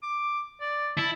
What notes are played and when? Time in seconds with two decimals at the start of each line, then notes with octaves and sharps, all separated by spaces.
0.03 D6
0.61 D5
0.97 E4 A5